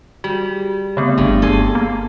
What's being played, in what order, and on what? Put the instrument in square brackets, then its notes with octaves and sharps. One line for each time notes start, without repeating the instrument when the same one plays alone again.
[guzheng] G3 [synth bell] F#4
[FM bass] C#3 [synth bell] A3 B3 C4
[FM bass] G1 [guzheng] G2
[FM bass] F#1 [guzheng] A4 G#5 C6
[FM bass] A#3